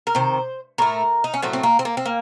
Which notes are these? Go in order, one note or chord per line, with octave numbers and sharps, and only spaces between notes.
A#4
C3 D#3 C5
A2 A3 A#4
D#4
C#4
A2 F#3 A3 C4
C4
A#3
C4
A#3
C4
A#3